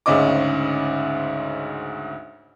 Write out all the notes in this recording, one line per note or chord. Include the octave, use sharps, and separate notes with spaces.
D2 G#2 C#3 C#4 D#5 D6